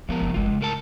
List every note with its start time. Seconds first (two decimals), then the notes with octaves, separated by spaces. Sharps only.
0.09 F3 G#3 B3 A#4
0.20 F#1
0.34 G1 D#2 G#3 F4
0.48 C#3
0.61 A2 A#4 A5